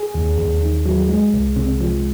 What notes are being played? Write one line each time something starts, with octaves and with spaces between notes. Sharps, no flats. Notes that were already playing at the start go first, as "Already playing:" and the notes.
Already playing: G#4
D#2
D#2
D#3
F#3
G#3
C2
C3
F3